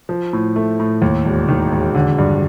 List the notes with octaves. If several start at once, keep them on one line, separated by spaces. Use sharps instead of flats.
F3
A2
A3
A2
D#2
E1
D#3
E1
D3
G2